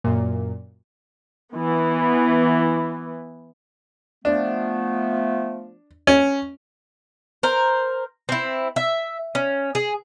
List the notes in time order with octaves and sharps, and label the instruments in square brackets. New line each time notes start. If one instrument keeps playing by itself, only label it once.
[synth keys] F#2 A#2
[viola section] E3 B3
[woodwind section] F3 A3 B3 [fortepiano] D4
[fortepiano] C#4
[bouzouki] A#4 C5
C4 E4
E5
C#4
G#4